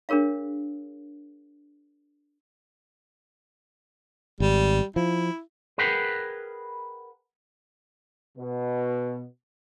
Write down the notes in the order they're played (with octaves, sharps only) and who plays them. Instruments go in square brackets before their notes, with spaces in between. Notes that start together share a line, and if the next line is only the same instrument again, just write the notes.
[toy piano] D4 G#4 A#4 C#5 F5
[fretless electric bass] G#1 [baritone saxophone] G3
[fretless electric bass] F3 [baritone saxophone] E4
[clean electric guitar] G#4 A#4 B4 F#5 G5
[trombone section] B2